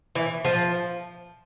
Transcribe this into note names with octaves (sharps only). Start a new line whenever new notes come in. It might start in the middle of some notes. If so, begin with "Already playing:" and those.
E3
F3